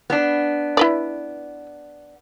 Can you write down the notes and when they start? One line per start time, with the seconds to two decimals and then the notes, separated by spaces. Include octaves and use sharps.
0.10 B3 D4
0.77 E4 B4 D5